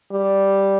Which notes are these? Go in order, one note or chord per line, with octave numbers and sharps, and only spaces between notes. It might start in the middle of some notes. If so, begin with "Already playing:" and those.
G3